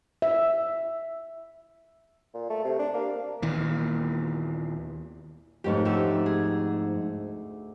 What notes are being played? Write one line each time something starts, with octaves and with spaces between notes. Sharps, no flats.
E5
A#2
A3
C3
D4
A#3
D#2 A#2 E3
F2 G#2 A3 C#4 G4
D2 G4 E6
G#4